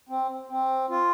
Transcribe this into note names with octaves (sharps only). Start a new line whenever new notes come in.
C4
C4
F4